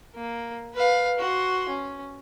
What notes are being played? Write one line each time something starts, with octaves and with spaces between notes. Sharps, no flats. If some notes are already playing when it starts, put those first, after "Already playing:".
A#3
B4 F5
F#4 C6
C#4